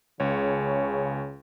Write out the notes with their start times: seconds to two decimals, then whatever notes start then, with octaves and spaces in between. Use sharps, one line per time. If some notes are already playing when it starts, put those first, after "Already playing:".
0.20 C#2 C#3 C#5